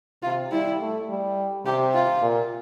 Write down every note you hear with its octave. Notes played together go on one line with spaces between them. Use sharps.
C3 F4
G3 E4
A3
G3
C3 G4
F4
A#2